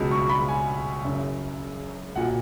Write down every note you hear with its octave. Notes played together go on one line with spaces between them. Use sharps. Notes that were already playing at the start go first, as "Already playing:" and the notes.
Already playing: C#2 B2 F#3
C#6
B5
G#5
F#1 F#2 C#3
B1 A#2 F#3 F#5